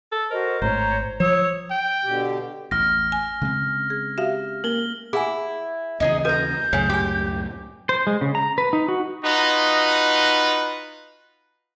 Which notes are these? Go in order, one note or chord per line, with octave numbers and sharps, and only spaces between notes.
A4
F#4 A#4 C5 D#5
G#1 A2 C5 C#5 A#5
F3 C#5 D#6 E6
G5
B2 D3 G4
A1 E2 F6 A#6
G#5
C#3 G#3 C4
G#4
F#4 G4 E5 F5
A#3 A#4 F#7 G7
E4 G#4 F#5 G#5
D#2 C#3 E3 D#4 G#4 D#5
F#4 A4 B4 G#5 A#5 G6
C#2 F#2 A2 C#3 C#5 G#5
F#4 G4 G#5
C5
G#3
C#3
A#5
B4
D#4
F#4
D#4 F4 F#4 B4 D#5